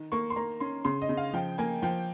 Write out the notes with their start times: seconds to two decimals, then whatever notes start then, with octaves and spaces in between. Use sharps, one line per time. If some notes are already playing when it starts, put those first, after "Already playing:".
Already playing: D#3
0.12 A#3 C#6
0.30 C6
0.36 A#3 A#5
0.60 C#4 C6
0.85 C#3 C6
1.02 D#5
1.09 C#3
1.17 F5
1.34 F3 G5
1.58 A#3 G#5
1.82 F3 G5